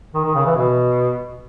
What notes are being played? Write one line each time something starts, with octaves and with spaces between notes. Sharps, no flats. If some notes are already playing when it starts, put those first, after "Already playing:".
D#3
D#3
C#3
E3
B2